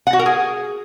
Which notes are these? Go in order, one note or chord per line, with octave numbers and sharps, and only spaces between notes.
F#5
F#4
A#4
G#4